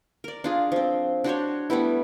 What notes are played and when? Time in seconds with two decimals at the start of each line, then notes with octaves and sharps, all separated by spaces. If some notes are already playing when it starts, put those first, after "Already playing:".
0.24 A#4 D5
0.44 D4 F4 G#4
0.72 F3 C4
1.24 D4 F#4 C5 C#5
1.70 G3 A3 B3 E4